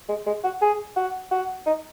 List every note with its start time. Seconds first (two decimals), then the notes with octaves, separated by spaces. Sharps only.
0.09 G#3
0.26 G#3
0.44 F#4
0.61 G#4
0.96 F#4
1.31 F#4
1.66 D#4